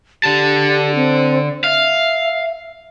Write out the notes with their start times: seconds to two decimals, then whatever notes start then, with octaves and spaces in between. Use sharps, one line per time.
0.24 D3 G4 A5
0.95 C4
1.64 E5 F5